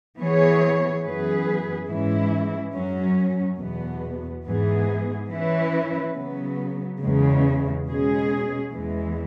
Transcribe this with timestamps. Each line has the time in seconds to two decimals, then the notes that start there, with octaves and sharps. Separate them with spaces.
0.19 E3 B3 G#4 C#5
1.03 F#2 E3 B3 G#4 B4
1.90 G#2 E3 G#3 C#4 E4
2.75 F#2 F#3 C#4
3.60 E2 B2 B3
4.46 G#2 E3 B3 G#4
5.30 E3 C#4 E4 B4
6.16 C#3 F#3 B3
7.02 E2 C#3 G#3
7.88 B2 G#3 C#4 G#4
8.73 E2 E3 G#3